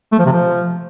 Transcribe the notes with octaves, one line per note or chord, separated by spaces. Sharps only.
A3
F3
C3
F3